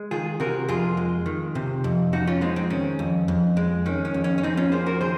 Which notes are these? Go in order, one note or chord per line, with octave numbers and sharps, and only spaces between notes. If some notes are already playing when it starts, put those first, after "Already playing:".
Already playing: G#3
D#3 F4 G#4
C3 F#4 A#4
F2 F4 G#4
G#3
D#3
C3
F2
F2 D#4 F#4
C#4 F4
G#3 C4 D#4
C4
D#3 C#4
F2
F2
G#3
D#3 C#4
C#4
F2
C#4
C#4
F2 C4 D#4
C#4 F4
A#3 G#4 C5
F#4 A#4
D#3 G#4 C5